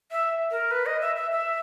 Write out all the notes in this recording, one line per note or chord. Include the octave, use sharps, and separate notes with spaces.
E5
A#4
B4
D#5
E5
E5
E5